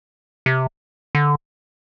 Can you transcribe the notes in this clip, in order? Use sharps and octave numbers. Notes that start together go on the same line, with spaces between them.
C3
D3